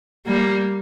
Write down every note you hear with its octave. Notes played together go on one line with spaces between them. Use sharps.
G3 A#3